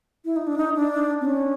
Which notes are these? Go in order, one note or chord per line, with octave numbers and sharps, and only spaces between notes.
E4
D#4
D4
D#4
D4
C4
C#4